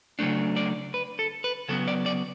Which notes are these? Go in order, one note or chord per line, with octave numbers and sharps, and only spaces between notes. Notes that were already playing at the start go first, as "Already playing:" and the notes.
C#3 F#3 A3 D4
D5
B4
A4
B4
C#3 F#3 B3 A4
D5
D5